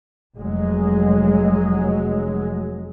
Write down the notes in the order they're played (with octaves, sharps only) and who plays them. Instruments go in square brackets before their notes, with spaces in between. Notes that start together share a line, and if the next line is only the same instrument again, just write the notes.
[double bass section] F1 F#3 G#3